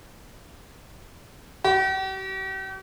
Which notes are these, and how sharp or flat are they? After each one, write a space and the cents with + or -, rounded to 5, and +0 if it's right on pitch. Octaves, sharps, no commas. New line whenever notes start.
G4 -45